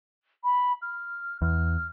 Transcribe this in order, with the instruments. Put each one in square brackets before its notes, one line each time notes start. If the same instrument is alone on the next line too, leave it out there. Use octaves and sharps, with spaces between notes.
[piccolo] B5
F6
[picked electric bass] E2 [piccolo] F6